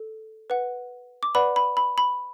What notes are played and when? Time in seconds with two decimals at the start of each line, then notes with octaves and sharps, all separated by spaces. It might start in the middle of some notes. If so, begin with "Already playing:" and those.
Already playing: A4
0.50 B4 F#5
1.23 D6
1.35 B4 D5 F#5 B5
1.56 B5
1.77 B5
1.98 B5